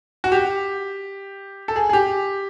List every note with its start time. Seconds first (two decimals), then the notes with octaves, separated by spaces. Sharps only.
0.24 F#4
0.32 G4
1.68 A4
1.76 G#4
1.89 G#4
1.93 G4